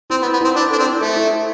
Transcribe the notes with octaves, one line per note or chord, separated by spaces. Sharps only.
C4 E4
B3
E4
B3
C4 E4
D4 C5
D4 A4
C4
E4
A3 A4
E4
A4